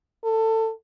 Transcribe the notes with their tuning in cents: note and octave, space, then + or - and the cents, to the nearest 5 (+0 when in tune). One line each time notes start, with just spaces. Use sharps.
A4 +20